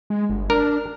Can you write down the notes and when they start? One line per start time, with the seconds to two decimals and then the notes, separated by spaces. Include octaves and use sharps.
0.10 G#3
0.30 G1
0.50 D4 A#4